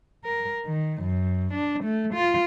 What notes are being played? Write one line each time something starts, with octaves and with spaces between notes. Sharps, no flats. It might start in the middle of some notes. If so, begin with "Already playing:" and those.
A#4
D#3
F#2
D4
A3
F4